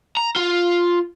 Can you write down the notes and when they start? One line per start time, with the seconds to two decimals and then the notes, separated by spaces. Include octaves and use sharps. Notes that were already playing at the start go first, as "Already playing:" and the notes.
0.17 A#5
0.36 F4